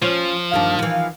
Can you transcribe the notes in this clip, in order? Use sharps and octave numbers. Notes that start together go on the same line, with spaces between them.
F3 C#4 F4 C5
D2 G2 D#3 D4 F5
E3 F3